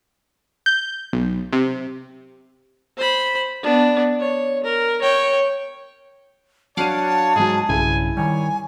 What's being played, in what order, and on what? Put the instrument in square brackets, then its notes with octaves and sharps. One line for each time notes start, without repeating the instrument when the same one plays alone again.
[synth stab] G6
B1
C3
[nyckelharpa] C5 B5
B3 D4
C#5
A#4
C#5 G5
[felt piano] F#3 D4 D#7 [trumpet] C#5 [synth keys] F5 F#5 D6 [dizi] A5
[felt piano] G#2 F#3 [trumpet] G#4
[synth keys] B1 G2 C#3 [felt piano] E4 [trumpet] G#5
[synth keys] D#3 G3 [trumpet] C#5 [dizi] G#5